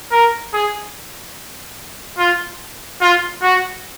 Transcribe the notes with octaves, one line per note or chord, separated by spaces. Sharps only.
A#4
G#4
F4
F4
F#4